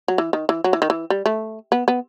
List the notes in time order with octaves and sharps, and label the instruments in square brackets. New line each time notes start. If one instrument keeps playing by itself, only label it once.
[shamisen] F#3
E3
D#3
E3
F#3
E3
D#3
E3
G3
A3
B3
B3